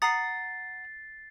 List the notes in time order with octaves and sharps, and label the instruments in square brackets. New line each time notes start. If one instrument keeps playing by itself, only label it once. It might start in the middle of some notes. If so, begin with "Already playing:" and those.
[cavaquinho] F#5 A#5 D#6 [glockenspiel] A6 C7